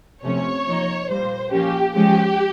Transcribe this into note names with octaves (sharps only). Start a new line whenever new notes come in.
C3 F3 A3 C#4 C#5
F3 A#3 D#4
A#2 G3 A#3 C5
F3 A#3 C#4 G4
F3 G#3 C#4 G4